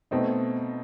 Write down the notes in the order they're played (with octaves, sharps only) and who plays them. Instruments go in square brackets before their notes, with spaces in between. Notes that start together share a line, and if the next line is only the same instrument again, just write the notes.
[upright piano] B2 A3 C4 D#4